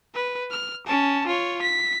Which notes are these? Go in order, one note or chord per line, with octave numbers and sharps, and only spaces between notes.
B4
F6
C#4 A5
F4 C#5
B6